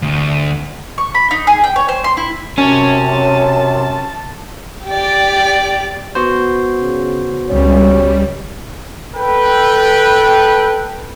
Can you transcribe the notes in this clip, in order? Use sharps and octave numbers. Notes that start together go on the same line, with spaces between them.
D2
C#6
B5
D#4
G#4
G5
C#5
C5
C6
E4
F#2 C3 C#4 A5
G4 D5
B3 F#4 C5
C#3
C#2 G3 C#5
A4 B4 G5